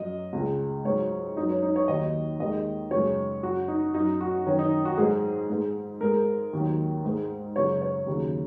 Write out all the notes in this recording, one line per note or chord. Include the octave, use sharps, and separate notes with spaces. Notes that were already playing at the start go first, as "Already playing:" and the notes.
Already playing: F#2 F#3 D#5
C#2 C#3 G#3
G#2 F#3 C#5
F#2 F#3 D#4
C#4
D#4
C#5
D#2 D#3 F#3 D#5
D#2 D#3 G#3 D#5
F#2 C#3 G#3 C#5
F#2 F#3 F#4
D#4
F#2 F#3 D#4
F#4
F#2 D#3 F#3 C#4
D#4
F#4
G#2 F#3 G#4
G#2 G#3
G#2 G#3 A#4
D#2 D#3 F#3
G#2 G#3
F#2 C#3 F#3 C#5
C#5
D#2 C#3 F#3